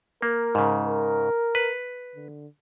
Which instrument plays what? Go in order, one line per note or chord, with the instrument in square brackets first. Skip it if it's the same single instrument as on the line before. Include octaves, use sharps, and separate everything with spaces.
[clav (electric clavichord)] A#3 [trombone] A#4
[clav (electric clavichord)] G#2 C#3
[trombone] A#4
[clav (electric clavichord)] B4
[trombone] D3